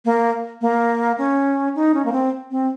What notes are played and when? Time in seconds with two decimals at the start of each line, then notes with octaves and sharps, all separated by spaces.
0.05 A#3
0.61 A#3
1.18 C#4
1.75 D#4
1.94 C#4
2.05 A#3
2.12 C4
2.51 C4